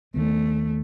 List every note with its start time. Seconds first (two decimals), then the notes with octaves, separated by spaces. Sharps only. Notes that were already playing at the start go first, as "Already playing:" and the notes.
0.14 D#2 D#3 F#3 A3 B3